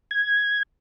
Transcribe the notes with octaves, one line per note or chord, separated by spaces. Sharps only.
G#6